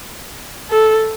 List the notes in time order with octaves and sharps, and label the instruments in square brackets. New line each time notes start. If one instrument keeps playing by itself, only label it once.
[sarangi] A4